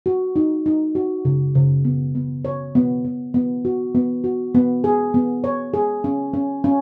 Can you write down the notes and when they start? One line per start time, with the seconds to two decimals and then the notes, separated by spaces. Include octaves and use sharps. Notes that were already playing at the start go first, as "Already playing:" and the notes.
0.06 F#4
0.36 D#4
0.66 D#4
0.95 F#4
1.25 C#3
1.55 C#3
1.85 B3
2.15 B3
2.45 C#5
2.75 B3
3.05 B3
3.34 B3
3.65 F#4
3.95 B3
4.24 F#4
4.55 B3
4.84 G#4
5.14 B3
5.44 C#5
5.74 G#4
6.04 C#4
6.33 C#4
6.64 C#4